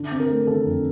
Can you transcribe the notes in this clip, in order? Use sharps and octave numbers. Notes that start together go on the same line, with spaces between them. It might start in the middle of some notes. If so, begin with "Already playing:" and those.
Already playing: D3
C4
A#4
A3
D3 A4
F2